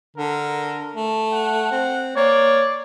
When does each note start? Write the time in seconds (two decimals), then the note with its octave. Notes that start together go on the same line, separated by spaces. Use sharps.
0.17 D3 A#4
0.96 A3
1.32 F#5
1.71 C4
2.16 A#3 C#5 D5